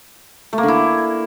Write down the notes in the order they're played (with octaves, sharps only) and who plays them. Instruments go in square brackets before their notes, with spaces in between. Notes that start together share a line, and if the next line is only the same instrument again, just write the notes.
[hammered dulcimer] A3
A#3
D3
E4